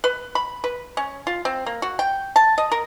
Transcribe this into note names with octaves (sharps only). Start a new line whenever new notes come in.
B4
B5
B4
C#4
F4
C4
A#3
F#4
G5
A5
D#5
A#4